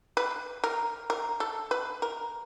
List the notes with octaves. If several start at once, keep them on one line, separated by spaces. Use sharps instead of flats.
B4
A#4
A#4
A4
B4
A#4